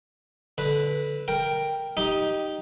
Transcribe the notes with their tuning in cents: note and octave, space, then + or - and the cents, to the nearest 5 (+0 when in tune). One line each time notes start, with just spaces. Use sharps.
D3 -15 B4 +0
A#4 +0 G5 +0
D#4 +0 G4 -10